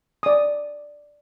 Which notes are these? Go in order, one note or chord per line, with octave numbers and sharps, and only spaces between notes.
D5 D#6